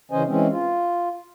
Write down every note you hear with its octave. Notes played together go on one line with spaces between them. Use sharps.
C#3 E3 C#4 C5 D#5 G#5
E3 G#3 C4 C#4
F4